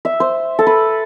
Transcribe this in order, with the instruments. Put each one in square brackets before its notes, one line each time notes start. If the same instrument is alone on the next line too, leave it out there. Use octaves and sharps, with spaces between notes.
[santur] E5
C5
A4
B4